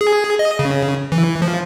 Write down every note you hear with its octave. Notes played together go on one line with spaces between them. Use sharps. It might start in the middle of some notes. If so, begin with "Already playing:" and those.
G#4
D#5
C#3
E3
F3